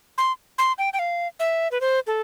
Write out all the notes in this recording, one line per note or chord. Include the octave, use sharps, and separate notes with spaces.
C6
C6
G5
G5
F5
E5
B4
C5
A4